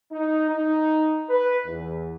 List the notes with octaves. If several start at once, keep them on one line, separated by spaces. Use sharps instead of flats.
D#4
D#4
B4
E2